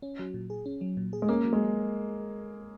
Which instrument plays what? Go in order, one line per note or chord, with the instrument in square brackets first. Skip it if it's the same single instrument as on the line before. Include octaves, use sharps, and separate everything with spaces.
[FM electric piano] C#4
F#3
A#2
G#4
C#4
F#3
A#2
G#4
[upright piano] G#3
[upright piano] A#3 [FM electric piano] C#4
[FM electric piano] F#3
[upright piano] G#3